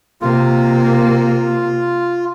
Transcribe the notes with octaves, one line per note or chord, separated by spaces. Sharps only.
C3 A#3 F4